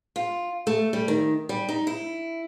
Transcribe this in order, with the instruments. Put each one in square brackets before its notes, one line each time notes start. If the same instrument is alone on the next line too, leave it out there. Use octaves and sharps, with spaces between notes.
[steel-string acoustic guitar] F4
A3
G3
D#3
G3
D#4
E4